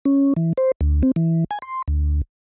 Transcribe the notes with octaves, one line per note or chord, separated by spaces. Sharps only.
C#4
E3
C5
D2
C4
E3
G#5
C6
D2